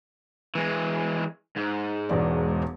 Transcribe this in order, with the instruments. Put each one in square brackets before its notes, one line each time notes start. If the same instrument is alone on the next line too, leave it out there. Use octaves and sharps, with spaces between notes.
[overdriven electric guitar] E3 G#3
G#2
[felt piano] E1 E2 D5